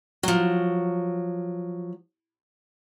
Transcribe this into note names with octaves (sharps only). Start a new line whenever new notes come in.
F3 F#3